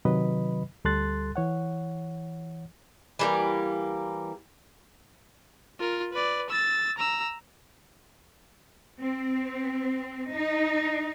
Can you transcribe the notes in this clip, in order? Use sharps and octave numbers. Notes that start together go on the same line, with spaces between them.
C3 D#3 F#3 B4 D#5 B5
D2 G3 A4 C6 F#6 A6
E3 C#5 F#5
E3 G3 A#3
F4 A#4
B4 D5
E6 A6
A#5 E6
C4
D#4